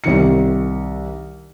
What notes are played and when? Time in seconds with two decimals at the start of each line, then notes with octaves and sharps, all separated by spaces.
0.04 C2 D#3 C#7